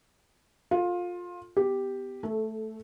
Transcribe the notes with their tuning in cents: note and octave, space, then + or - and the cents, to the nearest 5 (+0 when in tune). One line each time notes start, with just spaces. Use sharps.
F4 +20 A4 +10
B3 +25 G4 +0
A3 +0 A4 -20